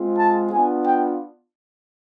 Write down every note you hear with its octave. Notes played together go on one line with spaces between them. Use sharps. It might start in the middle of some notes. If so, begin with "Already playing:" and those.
Already playing: G#3 C4 F4
A5
B3 D4 F4 G#5
G5